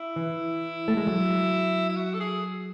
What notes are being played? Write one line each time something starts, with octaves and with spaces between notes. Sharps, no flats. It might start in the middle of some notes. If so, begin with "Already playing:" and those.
Already playing: E4
E3
A3
G#3
F#3
E4
F#4
A4
G#4